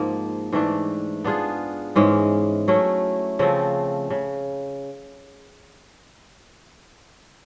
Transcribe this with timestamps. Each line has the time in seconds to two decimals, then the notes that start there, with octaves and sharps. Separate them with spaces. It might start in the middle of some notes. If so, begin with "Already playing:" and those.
Already playing: G#2 F3 A#3
0.52 G#2 E3 A3 D4
1.24 B3 D4 F4 G#4
1.96 G#2 E3 G#3 C#4
2.68 F#3 A3 C#4 E4
3.39 C#3 F3 A3 C4
4.10 C#3